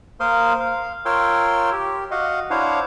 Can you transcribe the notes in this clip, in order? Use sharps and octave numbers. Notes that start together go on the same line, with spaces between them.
A#3 A#4 C5 F5 C6 D#6
F5
F4 A#4 C#5 G5 C6 E6
G4
F#4 D#5 F5 F#5
D4 E4 C5 C#5 F5 F#5